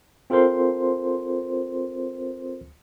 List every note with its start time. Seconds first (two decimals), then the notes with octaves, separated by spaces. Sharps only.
0.30 C4 F4 A4 A#4 C5 C6